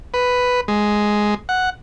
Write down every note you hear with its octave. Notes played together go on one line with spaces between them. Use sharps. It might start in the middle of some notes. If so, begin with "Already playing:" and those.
B4
G#3
F#5